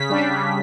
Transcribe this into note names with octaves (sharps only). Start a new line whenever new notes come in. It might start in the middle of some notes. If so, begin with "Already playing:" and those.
Already playing: C#3 B6
G3 D4
C#3